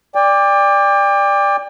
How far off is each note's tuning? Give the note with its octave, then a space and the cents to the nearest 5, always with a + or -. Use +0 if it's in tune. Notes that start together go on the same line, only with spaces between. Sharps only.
D5 +0 G5 +35